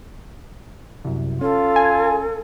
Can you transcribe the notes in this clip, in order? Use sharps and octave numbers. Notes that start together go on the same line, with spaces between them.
C2 F#2
C#4 F4 A4
G#5